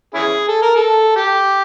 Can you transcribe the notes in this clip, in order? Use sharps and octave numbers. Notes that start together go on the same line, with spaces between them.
C#4 E4 G#4
A4
A#4
A4
G4